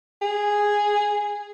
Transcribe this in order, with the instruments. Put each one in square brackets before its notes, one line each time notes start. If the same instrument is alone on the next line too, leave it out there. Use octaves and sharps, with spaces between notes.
[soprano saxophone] G#4